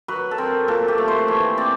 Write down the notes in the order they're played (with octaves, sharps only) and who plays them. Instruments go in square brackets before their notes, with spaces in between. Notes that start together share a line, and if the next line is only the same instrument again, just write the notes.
[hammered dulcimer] F#3 B4
A4
C4 A#4
A#2 A4
G4
A3
C5
E3 C#5
C4 D5